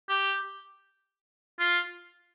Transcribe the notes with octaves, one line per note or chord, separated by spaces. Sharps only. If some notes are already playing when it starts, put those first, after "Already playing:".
G4
F4